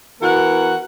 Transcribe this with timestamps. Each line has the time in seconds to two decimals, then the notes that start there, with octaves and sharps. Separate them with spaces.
0.21 E3 B3 F#4 A#4 F#5